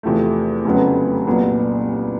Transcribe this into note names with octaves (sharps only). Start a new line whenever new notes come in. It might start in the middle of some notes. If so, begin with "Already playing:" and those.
E2 C3 F3 A3
F1 F2 C#3 F#3 B3
C2 A#2 F#3 B3